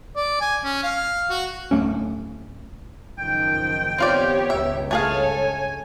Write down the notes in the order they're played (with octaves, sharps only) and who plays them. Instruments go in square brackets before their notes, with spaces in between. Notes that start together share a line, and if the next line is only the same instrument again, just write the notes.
[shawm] D5
G#5
C#4
F5
F#4
[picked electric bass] D1 F2 A3 C#4
[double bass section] F#1 D#3 F3 [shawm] G5
[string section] B3 G4 C#5 [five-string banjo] C4 F4 D5
[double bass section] C#2 G2 [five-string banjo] E5
[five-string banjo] A3 G#4 F5 [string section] A4 C#5 [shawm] G#5